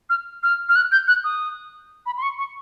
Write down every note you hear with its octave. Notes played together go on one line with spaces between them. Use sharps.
F6
F6
F6
F#6
G6
F#6
D#6
B5
C6
C#6
C#6